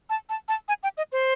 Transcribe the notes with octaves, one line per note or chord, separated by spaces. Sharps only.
A5
A5
A5
G#5
G5
D#5
C5